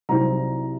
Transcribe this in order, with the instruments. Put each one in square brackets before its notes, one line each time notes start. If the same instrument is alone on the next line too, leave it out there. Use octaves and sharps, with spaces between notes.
[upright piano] C2 C3 F#3 C4 D#4 A#5